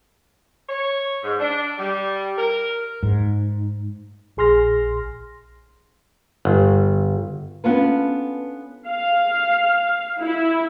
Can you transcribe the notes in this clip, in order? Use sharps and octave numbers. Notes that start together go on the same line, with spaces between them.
C#5
G#2
D4
G3
A#4
G#2
A#1 G#4 C6 F6 A#6
G1
B3 C#4 D4 F4 A4 B4
F5
E4